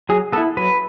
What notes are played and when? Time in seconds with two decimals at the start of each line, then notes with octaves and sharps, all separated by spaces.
0.09 F#3 G#4
0.32 B3 A4
0.37 E4
0.57 F#3 B4